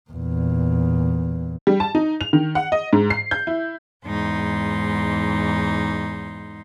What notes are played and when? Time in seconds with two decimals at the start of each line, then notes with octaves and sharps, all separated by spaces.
0.10 E2 A#2
1.67 G3
1.80 A5
1.95 D#4
2.21 F7
2.33 D#3
2.55 F#5
2.72 D#5
2.93 G#2
3.10 C7
3.31 G6
3.47 E4
4.04 E2 G#2 D#4 C6